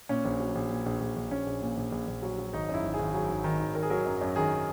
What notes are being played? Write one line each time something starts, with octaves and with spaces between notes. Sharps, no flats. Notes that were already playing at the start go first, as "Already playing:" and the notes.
A#2 C#4
A#1
F#3
A#1
A#2
A#1
A#1
A#1
A#1 C#4
A#1
A#2
A#1
A#1
A#1
F#3
F#3
G#1 D#4
F#2
E4
G#1
G#4
G#1
F#3 G#4
G#1
D#3
G#1
D#3 A#4
G#4
F#3 A#4
F#2
F#2
D#3 G#4